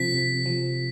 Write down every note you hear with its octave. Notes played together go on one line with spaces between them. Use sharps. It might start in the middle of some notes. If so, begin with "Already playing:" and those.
Already playing: C3 F3 C4 B6
C3
F3